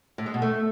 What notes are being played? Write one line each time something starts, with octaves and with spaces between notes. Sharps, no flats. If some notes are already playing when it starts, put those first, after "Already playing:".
A2
G#3
B2
A3